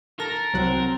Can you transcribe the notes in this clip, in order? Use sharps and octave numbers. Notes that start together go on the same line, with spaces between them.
A4 A#4 A#6
C2 F#3 C4 F#5